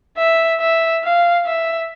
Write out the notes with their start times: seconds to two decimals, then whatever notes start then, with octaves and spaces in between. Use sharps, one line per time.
0.18 E5
0.60 E5
1.04 F5
1.46 E5